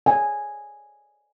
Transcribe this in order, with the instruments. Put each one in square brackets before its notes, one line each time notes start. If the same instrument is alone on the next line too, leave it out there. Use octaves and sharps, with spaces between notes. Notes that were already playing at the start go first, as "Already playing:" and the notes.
[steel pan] G#5